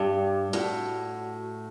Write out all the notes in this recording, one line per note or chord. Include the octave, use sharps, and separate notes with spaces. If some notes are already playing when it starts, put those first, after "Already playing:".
Already playing: G2 G4
A2 F#4